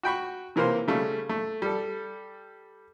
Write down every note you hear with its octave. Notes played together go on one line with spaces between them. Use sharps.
F#4 G5 B5 C#6
C3 E3 A#3 A#4 C5 C6
C#3 G3 A3
A3
G3 A4